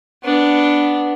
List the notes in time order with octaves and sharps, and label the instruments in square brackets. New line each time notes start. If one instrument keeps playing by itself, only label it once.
[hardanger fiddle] B3 D4